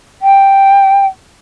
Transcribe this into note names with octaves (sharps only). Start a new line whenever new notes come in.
G5